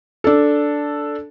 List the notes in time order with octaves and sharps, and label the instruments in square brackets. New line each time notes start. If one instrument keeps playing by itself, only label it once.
[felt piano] D4 A4